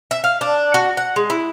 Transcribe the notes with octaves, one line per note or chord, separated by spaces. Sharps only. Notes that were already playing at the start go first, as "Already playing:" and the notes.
E5
F5
D4
F#4
F#5
G#3
E4